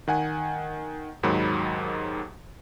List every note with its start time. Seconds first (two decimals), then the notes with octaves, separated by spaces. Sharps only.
0.08 D#3 F#5 G#5
1.23 D#2 G#2 D#3 F#3 B5